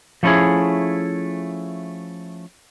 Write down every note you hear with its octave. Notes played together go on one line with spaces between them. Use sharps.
F3 A3 C#4 D#4 E4 G#4